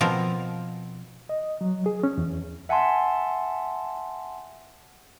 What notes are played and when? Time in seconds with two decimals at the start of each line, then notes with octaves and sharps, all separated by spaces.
0.01 B2 F3 C4 A#4
1.29 D#5
1.61 F#3
1.86 G#4
2.03 C#4
2.18 E2
2.69 E5 F#5 G#5 A5 C6